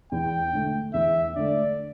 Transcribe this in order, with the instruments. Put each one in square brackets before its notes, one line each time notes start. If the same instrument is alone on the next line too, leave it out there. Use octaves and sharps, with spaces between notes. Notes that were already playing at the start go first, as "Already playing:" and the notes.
[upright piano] E2 [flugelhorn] G5
[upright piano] D3 A3
[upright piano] E2 [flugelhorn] E5
[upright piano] D3 A3 [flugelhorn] D5